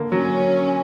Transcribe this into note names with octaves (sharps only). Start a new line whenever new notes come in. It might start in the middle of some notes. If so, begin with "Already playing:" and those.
Already playing: D3 A#3
F#3 C#4